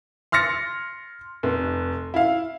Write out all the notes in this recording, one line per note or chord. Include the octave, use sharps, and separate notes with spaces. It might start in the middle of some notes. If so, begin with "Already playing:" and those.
C6 F6 A6 A#6 C#7
F1
E4 F5